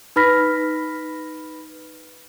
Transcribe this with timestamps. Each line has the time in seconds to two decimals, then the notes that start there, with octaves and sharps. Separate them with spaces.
0.16 D#4 B4 B5 F6 A#6 B6